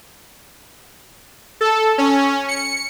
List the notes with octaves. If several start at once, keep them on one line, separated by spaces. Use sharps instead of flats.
A4
C#4
C#7